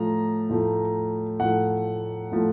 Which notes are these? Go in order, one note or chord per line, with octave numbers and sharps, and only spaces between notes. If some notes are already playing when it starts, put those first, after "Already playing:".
Already playing: A2 F3 A3 A#5
A2 F3 A3
A2 F3 A3 F#5
A2 F3 A3